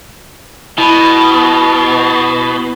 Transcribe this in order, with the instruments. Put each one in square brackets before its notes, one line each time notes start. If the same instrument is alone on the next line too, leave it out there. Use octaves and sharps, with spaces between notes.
[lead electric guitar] B2 [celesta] E4 B5